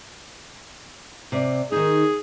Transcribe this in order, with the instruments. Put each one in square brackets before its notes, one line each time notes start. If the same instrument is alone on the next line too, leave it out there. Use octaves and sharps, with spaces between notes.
[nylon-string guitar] C3 D5
[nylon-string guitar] D#3 D#4 [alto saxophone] G#4